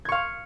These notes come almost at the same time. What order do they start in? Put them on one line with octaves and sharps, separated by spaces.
G#6 C#6 F5